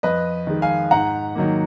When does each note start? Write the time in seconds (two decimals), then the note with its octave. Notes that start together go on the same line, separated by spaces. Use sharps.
0.03 F2 B4 D#5
0.47 D#3 G#3
0.62 F5 G#5
0.91 G#2 F#5 A#5
1.35 D#3 F#3 A#3